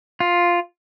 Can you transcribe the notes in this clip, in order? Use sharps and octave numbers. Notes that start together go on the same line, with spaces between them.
F4